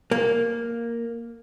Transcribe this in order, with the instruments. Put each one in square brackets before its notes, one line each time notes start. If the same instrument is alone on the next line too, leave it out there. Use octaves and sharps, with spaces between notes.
[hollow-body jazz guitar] A#3